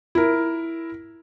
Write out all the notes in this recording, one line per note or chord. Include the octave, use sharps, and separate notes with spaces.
E4 A#4